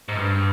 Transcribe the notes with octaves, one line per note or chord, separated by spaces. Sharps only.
G#2
G2